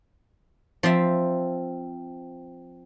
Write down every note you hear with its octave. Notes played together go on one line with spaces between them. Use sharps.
F3 C4 E5